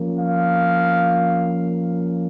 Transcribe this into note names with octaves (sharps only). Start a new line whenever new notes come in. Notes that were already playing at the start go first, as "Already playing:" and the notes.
Already playing: F3 A#3 C#4
F5